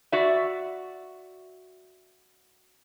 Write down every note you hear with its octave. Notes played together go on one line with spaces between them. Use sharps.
F#4 D5 E5